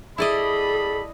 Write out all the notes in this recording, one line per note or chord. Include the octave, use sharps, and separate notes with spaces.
G3 E4 G#4 A4 D5 D#5 B5